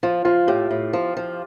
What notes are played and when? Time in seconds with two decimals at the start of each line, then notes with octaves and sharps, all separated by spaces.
0.03 F3 F4
0.25 F3 F4
0.47 A2 G4
0.71 A2
0.93 F3
1.17 F3